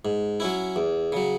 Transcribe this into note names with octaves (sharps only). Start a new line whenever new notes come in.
G#2
F#3 C#4 E4
E2
C#3 F#3